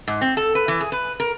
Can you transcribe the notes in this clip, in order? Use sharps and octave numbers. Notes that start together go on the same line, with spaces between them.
G#2
C4
A4
B4
E3
G#4
B4
A#4